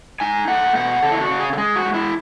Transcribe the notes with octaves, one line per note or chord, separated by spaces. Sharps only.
D#4 G#5
A3 F#5
B2 F#5
C#3 A4
E4
F#4
C#3
G#4
A4
G#3 G#4
F#4
G#3
E4